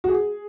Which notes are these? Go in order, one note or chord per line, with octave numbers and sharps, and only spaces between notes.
F#4
G#4